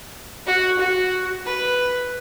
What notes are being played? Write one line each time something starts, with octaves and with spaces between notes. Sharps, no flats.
F#4
F#4
B4